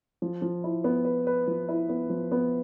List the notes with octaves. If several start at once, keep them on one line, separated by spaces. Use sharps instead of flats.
F3
F3
E4
B3
B4
B4
F3
E4
B3
F3
B3